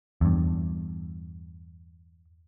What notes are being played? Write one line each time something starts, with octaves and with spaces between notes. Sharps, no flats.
E2 G2